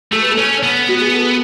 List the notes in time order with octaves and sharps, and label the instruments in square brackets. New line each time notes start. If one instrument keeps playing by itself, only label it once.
[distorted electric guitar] A3 [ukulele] A4
[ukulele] B4
A4
[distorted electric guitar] C#4
B3
[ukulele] F#4
G#4
A4